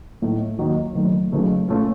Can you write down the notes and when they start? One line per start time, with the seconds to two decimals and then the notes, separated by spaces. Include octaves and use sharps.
0.22 A2 A3 D#4
0.59 D#2 D#3 F#3 A#3 D#4
0.95 F#1 F#2 D#3 A3
1.32 F#1 F#2 C#3 A3 D#4
1.68 A#2 A3 C#4 F4